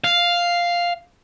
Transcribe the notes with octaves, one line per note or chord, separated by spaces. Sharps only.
F5